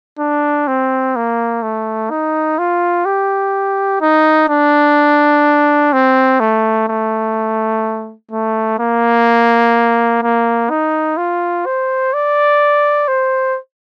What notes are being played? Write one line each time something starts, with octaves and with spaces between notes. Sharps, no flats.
D4
C4
A#3
A3
D#4
F4
G4
D#4
D4
C4
A3
A3
A3
A#3
A#3
D#4
F4
C5
D5
C5